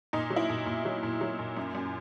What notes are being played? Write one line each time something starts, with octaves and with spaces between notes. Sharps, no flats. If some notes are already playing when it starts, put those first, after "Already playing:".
A#2 D#4
F#3
E4
A#2
A#2
F#3
A#2
F#3
A#2
F#2
F#2